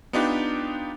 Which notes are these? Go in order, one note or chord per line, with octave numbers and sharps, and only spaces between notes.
B3 D4 D#4 F4 G4 B4